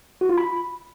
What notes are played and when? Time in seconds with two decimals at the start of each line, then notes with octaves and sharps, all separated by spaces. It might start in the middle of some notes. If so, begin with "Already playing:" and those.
0.21 F#4
0.29 F4
0.38 B5